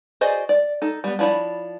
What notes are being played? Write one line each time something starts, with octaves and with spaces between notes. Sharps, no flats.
F#4 G#4 C5 D5 D#5
D5
D#4 A4
G3 B3
F3 D4 E4 C#5 B5